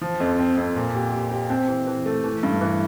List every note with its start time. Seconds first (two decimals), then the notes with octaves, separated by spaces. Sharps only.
0.01 F3
0.20 F2
0.39 C4
0.57 F2
0.76 A#2
0.95 G4
1.13 G4
1.31 G4
1.50 C4
1.68 E3
1.87 E3
2.06 A3
2.24 E3
2.43 G2
2.61 E3